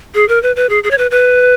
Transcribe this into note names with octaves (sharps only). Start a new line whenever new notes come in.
G#4
A#4
B4
B4
G#4
G#4
C#5
B4
B4